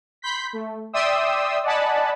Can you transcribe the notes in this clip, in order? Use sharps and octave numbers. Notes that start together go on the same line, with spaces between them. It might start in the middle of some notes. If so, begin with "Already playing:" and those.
B5 C6 G6 B6
A3
D5 E5 G5 C6 D#6 E6
D5 D#5 F#5 G#5 A5 B5